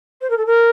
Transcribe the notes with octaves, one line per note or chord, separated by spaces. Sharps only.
C5
A#4
A4
A#4